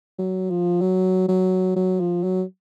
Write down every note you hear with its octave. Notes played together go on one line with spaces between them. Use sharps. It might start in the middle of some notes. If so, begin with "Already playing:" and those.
F#3
F3
F#3
F#3
F#3
F3
F#3